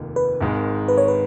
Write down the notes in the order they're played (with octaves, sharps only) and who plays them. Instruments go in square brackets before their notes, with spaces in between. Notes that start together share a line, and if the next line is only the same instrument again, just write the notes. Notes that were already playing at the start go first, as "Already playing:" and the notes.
Already playing: [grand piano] F1 D#2 D#3 A#3
[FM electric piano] B4
[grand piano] G#1 G#2 D#3
[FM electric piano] B4
C#5
B4